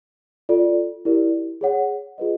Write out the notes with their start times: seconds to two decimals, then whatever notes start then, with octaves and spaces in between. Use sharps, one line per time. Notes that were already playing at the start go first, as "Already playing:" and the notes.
0.49 F4 A4 D5
1.05 E4 G4 A#4 D5
1.61 G#4 C#5 F#5
2.18 F4 G#4 B4 D#5